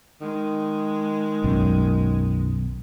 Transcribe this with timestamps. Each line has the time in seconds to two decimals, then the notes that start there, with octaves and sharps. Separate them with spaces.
0.21 D#3 G#3
1.44 B1 F#2